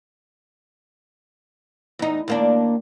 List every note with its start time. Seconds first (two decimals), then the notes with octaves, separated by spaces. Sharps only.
1.99 E2 D#4
2.28 D#2 A#3 D4